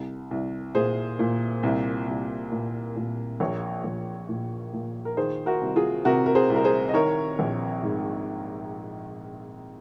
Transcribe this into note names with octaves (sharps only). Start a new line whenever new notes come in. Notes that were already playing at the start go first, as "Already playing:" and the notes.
Already playing: C2
C2
A#2 G#4 C5
A#2
C2
C2
A#2
A#2
A#1 A#4 C#5
A#1
A#2
A#2
A#4
D#3 G#4 C5
F#4 A#4
C2
F4 G#4
C3 F#4 A#4
A#4
G#4 C5
C2
A#4
G#4 C5
D#5
D#3 A#4 C#5
A#1
G#2